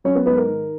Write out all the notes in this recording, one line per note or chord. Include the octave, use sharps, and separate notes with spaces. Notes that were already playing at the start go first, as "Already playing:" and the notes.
F#3 C#4 C#5
B3 B4
G#2 B3 B4
A#4
D#3